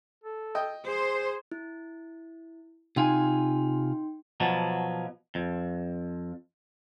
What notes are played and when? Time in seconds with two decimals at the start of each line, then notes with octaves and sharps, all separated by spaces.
0.24 A4
0.55 D#5 G5
0.87 G#4 C5
1.52 E4
2.96 C3 D#4 F4 G5 G#5 C6
4.40 B2 F3 F#3
5.35 F2